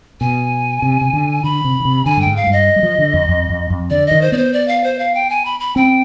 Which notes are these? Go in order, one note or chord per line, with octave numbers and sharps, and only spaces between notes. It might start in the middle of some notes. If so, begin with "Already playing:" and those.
B2 G#5
C3
C3
D3
D3 B5
C3
D3
C3
D3 G#5
G2
G5
G#2
F5
G2
D#5
G3
F3
D3
F2
F2
F2
F2
D3 D5
D#3 D#5
C5
B3 C5 D5
D5
F5
C5
F5
G5
G#5
B5
B5
C4 G5